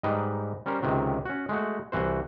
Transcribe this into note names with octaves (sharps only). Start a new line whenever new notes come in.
G#2 G3 D#4 B4 D#5 G5
G3 C#4 A#4 C5
C#2 C3 D#3 F#3
C#4 F#4
G#3 A3 F#4
C2 E3 F#4 C5